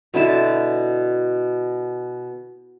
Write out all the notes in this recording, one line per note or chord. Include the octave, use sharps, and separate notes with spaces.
B2 D3 E4 A5